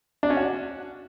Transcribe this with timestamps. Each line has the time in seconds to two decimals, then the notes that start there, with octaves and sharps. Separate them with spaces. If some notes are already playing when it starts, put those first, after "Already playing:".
0.23 D4
0.30 C#4
0.37 F#4